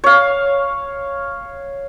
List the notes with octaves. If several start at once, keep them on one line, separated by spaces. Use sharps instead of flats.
C#5 F5